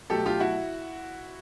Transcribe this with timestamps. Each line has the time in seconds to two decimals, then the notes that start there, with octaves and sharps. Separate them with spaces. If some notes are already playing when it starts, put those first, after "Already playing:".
0.10 B2 F#3 A3 G4 A4
0.26 F4 G4
0.40 E4 F#4